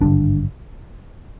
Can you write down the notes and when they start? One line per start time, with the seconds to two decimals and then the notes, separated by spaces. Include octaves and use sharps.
0.01 G#1 G2 D3 D4